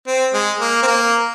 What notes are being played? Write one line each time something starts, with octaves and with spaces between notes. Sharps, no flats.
C4
G#3
A#3
C4
A#3